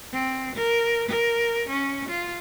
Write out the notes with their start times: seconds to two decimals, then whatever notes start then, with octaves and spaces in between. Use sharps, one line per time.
0.13 C4
0.56 A#4
1.09 A#4
1.69 C#4
2.09 F4